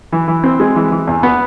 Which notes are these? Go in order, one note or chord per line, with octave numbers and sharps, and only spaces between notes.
E3
E3
C4
G#3
E3
E3
E2
B3